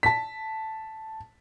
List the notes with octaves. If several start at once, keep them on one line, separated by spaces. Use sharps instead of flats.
A5 B6